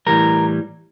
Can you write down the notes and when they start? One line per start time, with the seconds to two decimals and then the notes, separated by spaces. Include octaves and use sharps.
0.06 A2 E3 G3 A#4